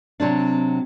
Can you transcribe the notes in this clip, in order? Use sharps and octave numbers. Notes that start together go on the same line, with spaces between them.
C3 F#3 C4 D4